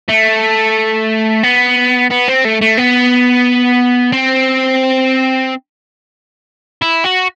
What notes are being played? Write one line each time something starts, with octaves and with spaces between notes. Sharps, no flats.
A3
B3
B3
C4
A3
A3
B3
C4
E4
F#4